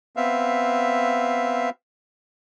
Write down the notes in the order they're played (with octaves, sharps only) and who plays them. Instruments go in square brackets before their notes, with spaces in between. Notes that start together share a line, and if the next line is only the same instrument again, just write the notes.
[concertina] B3 C4 E5 F5